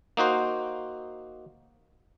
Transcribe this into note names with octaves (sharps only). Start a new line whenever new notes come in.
A#3 D#4 F#4 C5